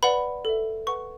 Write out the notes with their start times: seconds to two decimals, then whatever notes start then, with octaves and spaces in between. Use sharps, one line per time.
0.03 B4 D5 F#5 B5
0.45 A4 E5
0.87 B4 F#5 C#6